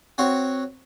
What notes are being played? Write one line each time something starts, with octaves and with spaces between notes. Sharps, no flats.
C4 F#4 C#5